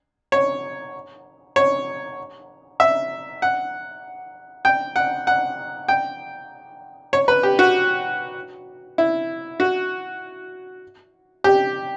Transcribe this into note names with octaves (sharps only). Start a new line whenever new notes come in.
C#5
C#5
E5
F#5
G5
F#5
F#5
G5
C#5
B4
G4
F#4
E4
F#4
G4